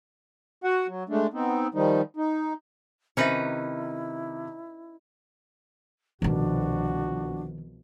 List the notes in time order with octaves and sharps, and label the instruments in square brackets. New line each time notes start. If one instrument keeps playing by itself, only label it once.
[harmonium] F#4 F#5
F#3
G#3 A3 D4
B3 C4 D#4
D#3 F3 G3 D#4
D#4
[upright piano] C3 D#3 [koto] C#4 D#4 B4 [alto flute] E4 [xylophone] C5 E5
[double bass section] C2 B2 F3 [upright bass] D3 D#3 [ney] D4 [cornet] F#4